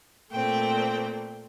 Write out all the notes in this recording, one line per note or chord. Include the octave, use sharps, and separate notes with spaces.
A#2 A3 C4 G5